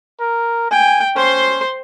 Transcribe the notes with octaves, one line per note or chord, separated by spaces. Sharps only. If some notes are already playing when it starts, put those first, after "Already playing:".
A#4
G5 G#5
C#4 C5 C6